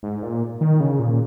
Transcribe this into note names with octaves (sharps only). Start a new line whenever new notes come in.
G#2
A#2
D#3
C#3
A#2